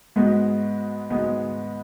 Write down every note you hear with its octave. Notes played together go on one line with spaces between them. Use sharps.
G#2 G#3 B3 F#4
G#2 G#3 B3 F#4